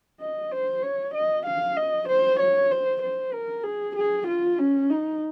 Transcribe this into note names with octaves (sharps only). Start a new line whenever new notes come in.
D#5
C5
C#5
D#5
F5
D#5
C5
C#5
C5
C5
A#4
G#4
G#4
F4
C#4
D#4